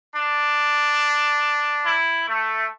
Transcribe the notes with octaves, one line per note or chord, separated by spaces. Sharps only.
D4
E4
A3